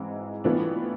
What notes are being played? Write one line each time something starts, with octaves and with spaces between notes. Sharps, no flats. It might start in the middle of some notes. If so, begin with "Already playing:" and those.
Already playing: G#2 E3 G#3 C4
A2 E3 B3 D4 F4